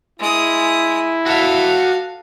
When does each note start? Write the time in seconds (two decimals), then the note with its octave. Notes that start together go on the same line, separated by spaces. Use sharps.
0.19 G#3 E4 D#6
1.26 F#4 A4 E5 F5